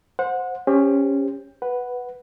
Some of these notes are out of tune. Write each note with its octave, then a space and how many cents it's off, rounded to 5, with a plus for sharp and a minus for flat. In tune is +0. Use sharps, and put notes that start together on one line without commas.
C5 +0 F#5 -25
C#4 +0 G4 +30 C5 +0
B4 +0 F#5 +0